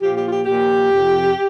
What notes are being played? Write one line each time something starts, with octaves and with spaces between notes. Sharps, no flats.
A#2 F3 G4
G4
F4
G4
A#2 F3 G4
F2 C3 F3